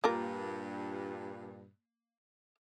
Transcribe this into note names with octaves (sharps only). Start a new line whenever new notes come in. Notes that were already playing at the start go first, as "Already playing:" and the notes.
G2 A#2 A#3 F4 A#4